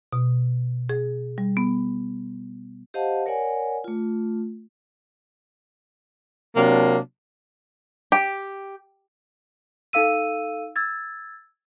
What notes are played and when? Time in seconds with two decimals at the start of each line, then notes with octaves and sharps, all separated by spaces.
0.13 B2
0.89 G#4
1.38 G3
1.57 B3
2.94 G4 C5 D#5 F5 F#5 A5
3.26 A#4 C#5 D5 F#5 G#5
3.84 A3 F4
6.57 C3 F#3 A#3 D4
8.12 G4
9.93 D#4 A4 F5 E6 D#7
10.76 E6 G#6 A6